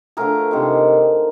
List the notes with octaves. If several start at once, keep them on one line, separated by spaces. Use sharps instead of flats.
D3 F3 A3 G#4 A#4
C3 D#3 G#3